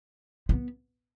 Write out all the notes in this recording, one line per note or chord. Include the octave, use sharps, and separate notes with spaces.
B3